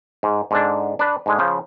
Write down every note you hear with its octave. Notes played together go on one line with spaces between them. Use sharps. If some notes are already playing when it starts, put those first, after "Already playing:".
G#2
G#2 D3 D4
D4 B4
G#2 D3 G#3
C#3 F3